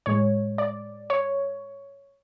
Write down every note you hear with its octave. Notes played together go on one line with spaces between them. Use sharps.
A2 G#3 C#5
D5
C#5